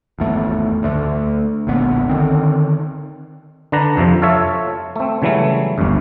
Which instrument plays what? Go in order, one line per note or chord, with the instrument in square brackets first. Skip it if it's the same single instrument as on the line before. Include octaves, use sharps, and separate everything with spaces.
[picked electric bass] G#1 E2 A3 B3
D2 D3 A3
E1 A#1 D3 B3
D3 D#3 C4
[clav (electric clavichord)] D3 D4 B4 A#5
F2 C3 F3
F4 A4 C#5 E5
A3 C4
C#3 E3 F#3 G3 A3
G1 D2 G2